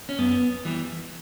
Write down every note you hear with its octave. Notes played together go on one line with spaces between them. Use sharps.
C#4
F#2 B3
E3 G3